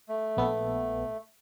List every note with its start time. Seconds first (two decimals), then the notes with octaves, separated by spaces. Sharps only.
0.09 A3
0.37 A#1 B3 A4